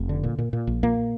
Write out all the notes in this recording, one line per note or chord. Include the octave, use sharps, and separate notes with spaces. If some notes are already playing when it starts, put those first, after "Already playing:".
Already playing: F1
D3
A#2
A#2
A#2
A#1
A#2 A#3